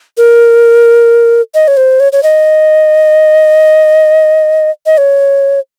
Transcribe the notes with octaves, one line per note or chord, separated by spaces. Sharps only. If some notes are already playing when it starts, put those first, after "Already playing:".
A#4
D#5
C#5
C5
C#5
C#5
D#5
D#5
C#5